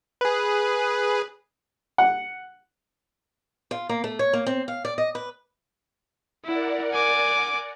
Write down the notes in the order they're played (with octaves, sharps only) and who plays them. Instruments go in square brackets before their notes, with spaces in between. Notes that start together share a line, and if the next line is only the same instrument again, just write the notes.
[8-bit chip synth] G#4 B4
[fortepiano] F#5
[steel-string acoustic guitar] F4
A#3
A3
C#5
A#3
C4
F5
D5
D#5
B4
[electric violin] E4 [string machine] A#4 D5 F#5
[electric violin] G#5 D6